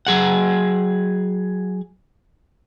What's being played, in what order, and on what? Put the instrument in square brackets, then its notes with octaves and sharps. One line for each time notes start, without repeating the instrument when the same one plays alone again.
[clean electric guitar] F#3 G#4 F#5